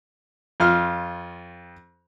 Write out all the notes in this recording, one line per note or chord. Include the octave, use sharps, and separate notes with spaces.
F2 F4 F6